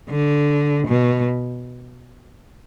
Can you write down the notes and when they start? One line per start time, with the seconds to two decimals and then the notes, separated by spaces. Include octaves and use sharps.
0.10 D3
0.88 B2